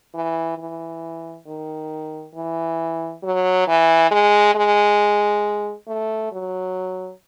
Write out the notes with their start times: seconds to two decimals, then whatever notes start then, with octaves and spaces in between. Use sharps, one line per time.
0.14 E3
0.58 E3
1.47 D#3
2.35 E3
3.23 F#3
3.67 E3
4.11 G#3
4.55 G#3
5.88 A3
6.32 F#3